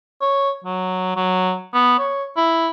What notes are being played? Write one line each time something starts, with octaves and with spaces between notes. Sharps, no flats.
C#5
F#3
F#3
B3
C#5
E4